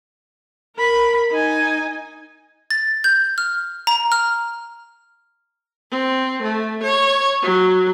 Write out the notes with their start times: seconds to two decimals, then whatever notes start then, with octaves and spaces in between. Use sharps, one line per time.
0.76 A#4 B5
1.31 D#4 G#5
2.70 A6
3.04 G6
3.38 F6
3.87 A#5
4.12 F6
5.91 C4
6.42 A3
6.83 C#5
7.42 F#3